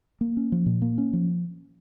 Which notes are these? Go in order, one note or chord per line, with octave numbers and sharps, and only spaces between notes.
A#3
C#4
F3
A#2
A#3
C#4
F3